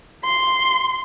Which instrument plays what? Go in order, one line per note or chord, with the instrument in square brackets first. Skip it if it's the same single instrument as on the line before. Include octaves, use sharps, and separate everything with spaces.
[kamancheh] C6